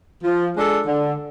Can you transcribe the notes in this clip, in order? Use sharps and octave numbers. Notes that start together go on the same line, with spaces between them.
F3
G#3 D4 A4
D3